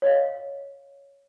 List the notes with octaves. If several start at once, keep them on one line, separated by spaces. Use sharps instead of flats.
C#5 D#5 F5